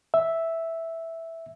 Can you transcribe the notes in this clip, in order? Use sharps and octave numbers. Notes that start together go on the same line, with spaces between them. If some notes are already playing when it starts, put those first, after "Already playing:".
E5